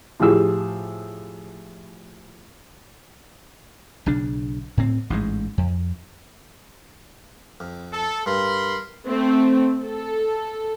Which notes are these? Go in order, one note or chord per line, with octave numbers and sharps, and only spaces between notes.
A2 F3 G4 G#4 E6
B1 C#3 D4
A2 C4
A1 G#2 B2 G#3
F2
F2
A4
G2 A#4 B5 C6
A3 C4
A4